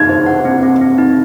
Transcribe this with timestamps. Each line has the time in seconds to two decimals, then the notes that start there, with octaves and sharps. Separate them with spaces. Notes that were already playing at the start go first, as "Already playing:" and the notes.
Already playing: D#4 G#6
0.09 C5
0.26 F#5
0.45 C4
0.63 C4
0.81 C4
0.98 D#4